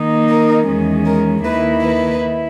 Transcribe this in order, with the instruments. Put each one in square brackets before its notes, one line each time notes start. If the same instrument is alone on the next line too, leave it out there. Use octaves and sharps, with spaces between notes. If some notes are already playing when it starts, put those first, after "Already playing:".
Already playing: [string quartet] D#3 A#3 D#4
A#4
E2 D#3 G#3 C#4
A#4
D#2 D#3 A#3 E4 B4
B4
E4